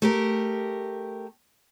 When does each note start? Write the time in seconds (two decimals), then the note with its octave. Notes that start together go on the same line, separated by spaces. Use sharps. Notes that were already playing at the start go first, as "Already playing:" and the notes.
0.02 A3 G4 A#4